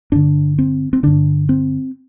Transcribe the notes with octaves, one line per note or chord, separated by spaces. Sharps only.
G2 D3 D4
C4
C4
G2 D3 D4
C4